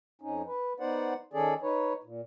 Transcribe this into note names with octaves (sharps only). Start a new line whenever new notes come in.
F2 C#4 D#4
B4
B3 D#4 C5 D5 F#5
D#3 C#4 G#4 A4 D5
D#4 B4 C#5
A#2